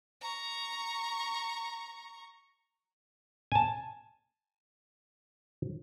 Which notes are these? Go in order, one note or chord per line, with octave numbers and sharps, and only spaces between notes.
A#5 C#6
G#5 A5